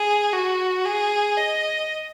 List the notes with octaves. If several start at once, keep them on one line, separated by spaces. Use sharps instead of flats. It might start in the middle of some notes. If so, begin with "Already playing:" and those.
Already playing: G#4
F#4
G#4
D#5